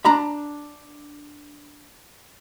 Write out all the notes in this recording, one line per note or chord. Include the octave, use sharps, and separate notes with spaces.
D4 A#5 B5